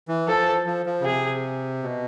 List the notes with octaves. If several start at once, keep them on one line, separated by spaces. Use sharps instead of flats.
E3
F3 A4
F3
F3
C#3
C3 G#4
B2